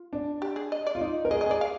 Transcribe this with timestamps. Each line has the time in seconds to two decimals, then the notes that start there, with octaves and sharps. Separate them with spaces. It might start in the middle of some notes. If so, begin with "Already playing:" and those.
Already playing: F4
0.13 D4
0.42 G4
0.56 G#4
0.72 D#5
0.86 D5
0.95 F4
1.01 D#4
1.25 A#4
1.31 G#4 D#5
1.41 D#5
1.46 G#4 D5
1.61 F5